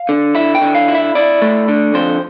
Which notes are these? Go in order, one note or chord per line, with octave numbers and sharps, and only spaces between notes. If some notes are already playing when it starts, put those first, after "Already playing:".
Already playing: F5
D3
E4 E5
G5
D3
F5
E4
E5
E4 D5
A3
D3
F2 C5